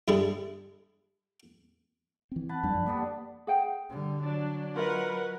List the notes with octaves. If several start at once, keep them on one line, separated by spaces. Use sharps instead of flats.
G2 D3 G3 E4 G#4 A4
E3 C4
B4 F#5 A5
F2 D3 G3 D4
F#2 F3
G3 A#3 B3 D4
G#4 F#5 G5
D3 G3
F#3 D4
F4 A#4 B4 D#5 F#5